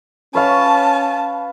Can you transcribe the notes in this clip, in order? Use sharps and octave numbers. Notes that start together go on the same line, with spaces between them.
C#4 B4 C#5 F5 A5